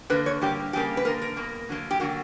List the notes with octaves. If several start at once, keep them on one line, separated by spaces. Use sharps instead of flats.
D3 A#3 B4
C#5
D3 G3 A#3 G4
C#3 G3 A#3 G4
B4
D3 A#3 A#4
A#4
B2 A#3
D3 F#3 A#3
G4
D3 F#3 A#3 F#4